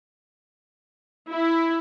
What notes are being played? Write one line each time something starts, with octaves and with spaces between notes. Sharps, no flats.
E4